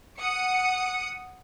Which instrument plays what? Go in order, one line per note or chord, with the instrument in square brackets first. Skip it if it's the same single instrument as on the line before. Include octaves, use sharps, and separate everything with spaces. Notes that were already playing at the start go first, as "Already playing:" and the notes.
[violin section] F#5 D#6 C#7